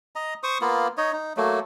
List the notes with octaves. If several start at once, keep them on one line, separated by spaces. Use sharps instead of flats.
D#5 A#5
C5 C#6 D#6
A#3 B3 F4
D#4 C#5 D#5
D#4
F#3 A3 A#3